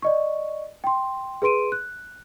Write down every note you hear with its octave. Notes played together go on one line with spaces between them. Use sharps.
D5 D#5 C#6
G5 C6
G#4 B4 C6 D7 D#7
F#6